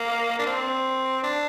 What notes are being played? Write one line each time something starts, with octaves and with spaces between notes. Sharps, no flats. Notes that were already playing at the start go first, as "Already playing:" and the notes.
Already playing: A#3
D4
C4
D4